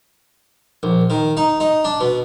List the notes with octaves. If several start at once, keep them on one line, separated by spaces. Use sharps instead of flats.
A#1
D#3
D#4
D#4
D4
B2